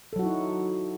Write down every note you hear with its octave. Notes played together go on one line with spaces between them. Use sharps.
F#3 D#4 E4 F#4 A4